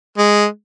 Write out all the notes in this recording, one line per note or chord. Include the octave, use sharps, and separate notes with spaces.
G#3